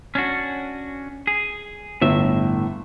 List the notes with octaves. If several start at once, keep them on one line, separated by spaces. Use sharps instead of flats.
C#4 D4 F#4
G#4
G1 A2 E5